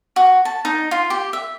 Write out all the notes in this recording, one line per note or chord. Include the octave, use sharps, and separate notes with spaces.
F#4
A5
D#4
F4
G4
E5